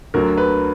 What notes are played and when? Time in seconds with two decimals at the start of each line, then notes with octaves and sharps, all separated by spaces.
0.14 D2 D3 F#3 A#4
0.37 B4